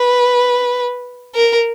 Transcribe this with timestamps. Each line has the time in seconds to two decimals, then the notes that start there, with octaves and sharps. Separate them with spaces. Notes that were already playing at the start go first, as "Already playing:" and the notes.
Already playing: B4
1.35 A#4